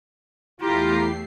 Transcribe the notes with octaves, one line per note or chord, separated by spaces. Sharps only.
E2 A3 E4 F4 G4 A#5 C7